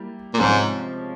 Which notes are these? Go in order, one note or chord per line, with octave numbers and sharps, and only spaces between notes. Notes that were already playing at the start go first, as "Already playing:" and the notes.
Already playing: G3 A#3 E4
A#2
G#2 C3 F3 G#3 C#4